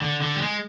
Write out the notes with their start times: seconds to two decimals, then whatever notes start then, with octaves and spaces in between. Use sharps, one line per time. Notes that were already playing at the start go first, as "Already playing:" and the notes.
0.02 D3
0.22 D3
0.36 G3
0.42 G#3